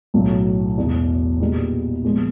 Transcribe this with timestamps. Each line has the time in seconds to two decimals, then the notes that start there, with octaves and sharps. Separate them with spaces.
0.14 B1 A2 F#3
0.77 E1 E2 B2
1.40 A#2 G3 B3 D#4 G#4
2.04 A#2 F3 G#3 B3